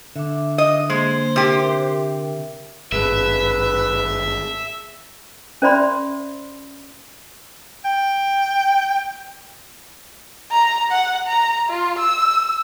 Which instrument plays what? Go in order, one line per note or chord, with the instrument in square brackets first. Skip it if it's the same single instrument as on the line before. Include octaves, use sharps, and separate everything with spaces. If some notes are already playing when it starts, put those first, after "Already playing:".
[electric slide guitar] D3 [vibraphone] E5 D6
[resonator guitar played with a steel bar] D#5
[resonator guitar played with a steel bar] G#3 [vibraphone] A#3 [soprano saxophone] C5
[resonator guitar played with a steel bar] C3 G4 [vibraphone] A#4 E5
[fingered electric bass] G#1 G2 [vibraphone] G#4 A5 [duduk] B4 [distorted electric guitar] E5
[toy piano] C#4 C5 D5 E5 B5 C6
[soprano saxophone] G5
[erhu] A#5
F#5
A#5
F4
E6